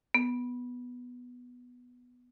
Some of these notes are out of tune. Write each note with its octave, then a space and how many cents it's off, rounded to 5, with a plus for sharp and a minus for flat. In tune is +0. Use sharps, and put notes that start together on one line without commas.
B3 +0